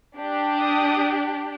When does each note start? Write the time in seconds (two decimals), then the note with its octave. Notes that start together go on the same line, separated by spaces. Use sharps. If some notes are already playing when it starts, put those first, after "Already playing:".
0.17 D4 G4
0.62 D#6